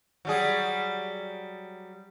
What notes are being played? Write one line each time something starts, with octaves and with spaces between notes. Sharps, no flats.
F#3 G3 G#4